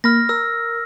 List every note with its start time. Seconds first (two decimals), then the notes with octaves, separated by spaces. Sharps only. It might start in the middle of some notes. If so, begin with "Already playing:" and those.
0.04 A#3 B5 F6 A#6
0.29 A#4 E6